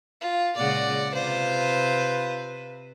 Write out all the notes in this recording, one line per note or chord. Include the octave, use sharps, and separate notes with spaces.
F4
A#2 C#3 G#3 D5 F#5
C3 F4 B4 C5